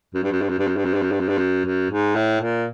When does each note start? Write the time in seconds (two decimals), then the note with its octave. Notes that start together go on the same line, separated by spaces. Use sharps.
0.14 F#2
0.23 G2
0.32 F#2
0.41 G2
0.49 F#2
0.58 G2
0.67 F#2
0.77 G2
0.85 F#2
0.94 G2
1.02 F#2
1.12 G2
1.20 F#2
1.28 G2
1.38 F#2
1.65 F#2
1.90 G#2
2.15 A2
2.41 A#2